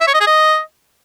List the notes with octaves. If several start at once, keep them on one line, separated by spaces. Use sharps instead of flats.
E5
C#5
D#5
G#4
D#5